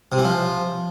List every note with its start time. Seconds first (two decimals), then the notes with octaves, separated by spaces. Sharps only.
0.12 C3
0.18 E3
0.25 F3